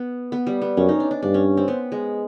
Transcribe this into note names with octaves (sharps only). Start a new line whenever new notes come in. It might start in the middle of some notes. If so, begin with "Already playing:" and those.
Already playing: B3
B3
G3
B3
F#2 C#4
D#4
D4
D4
G2 D4
C#4
C4
B3
G#3